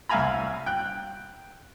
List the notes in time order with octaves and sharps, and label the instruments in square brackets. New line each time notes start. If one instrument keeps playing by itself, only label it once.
[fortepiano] C2 E5 F5 G#5 A#5 B5
G5 F#6